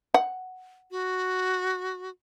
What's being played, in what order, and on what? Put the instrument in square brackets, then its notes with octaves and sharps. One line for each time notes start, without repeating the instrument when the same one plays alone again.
[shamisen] F#5
[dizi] F#4